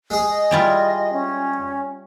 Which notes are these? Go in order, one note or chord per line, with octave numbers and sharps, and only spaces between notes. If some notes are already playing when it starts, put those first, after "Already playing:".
G#3 G#4
D#5
G3 E4 F4
C#4